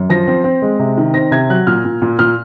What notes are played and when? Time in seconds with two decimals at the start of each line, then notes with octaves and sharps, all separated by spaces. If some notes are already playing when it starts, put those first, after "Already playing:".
Already playing: F#2
0.10 F3 A#6
0.28 C4
0.44 C4
0.62 G#3
0.79 C3
0.98 D#3
1.14 C4 A#6
1.31 C3 G#6
1.49 F#3 F#6
1.67 A#2 F6
1.85 A#2
2.02 A#2
2.19 A#2 F6